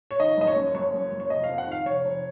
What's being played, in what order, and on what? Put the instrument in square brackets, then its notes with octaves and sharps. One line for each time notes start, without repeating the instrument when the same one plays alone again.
[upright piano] C#5
D#3 D#5
F#1 D#5
C#5
F#2
F#1 C#5
F#2
F#1
C#5
F1 D#5
F5
F2
F#5
D#3 F5
F1 C#5
F1